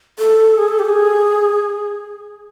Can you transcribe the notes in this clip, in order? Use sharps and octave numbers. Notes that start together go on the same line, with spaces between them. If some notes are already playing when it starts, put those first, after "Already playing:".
A4
G#4
A4
G4
A4
G#4